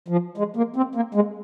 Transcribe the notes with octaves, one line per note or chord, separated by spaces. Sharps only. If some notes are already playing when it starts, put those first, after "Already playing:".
F3
G#3
A#3
C4
A#3
G#3